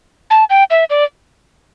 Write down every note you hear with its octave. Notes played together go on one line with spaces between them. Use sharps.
A5
G5
E5
D5